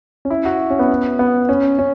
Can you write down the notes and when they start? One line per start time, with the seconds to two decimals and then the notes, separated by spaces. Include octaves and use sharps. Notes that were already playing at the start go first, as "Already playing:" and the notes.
0.25 C#4
0.30 E4
0.45 F#4
0.70 C#4
0.79 B3
1.19 B3
1.49 C#4
1.79 C#4